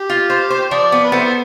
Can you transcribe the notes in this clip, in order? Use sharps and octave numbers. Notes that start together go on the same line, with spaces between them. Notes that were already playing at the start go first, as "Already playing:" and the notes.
Already playing: G4
F4
C5
C5
F3 D5
B3
B4
B3 E4 A4 C5
A4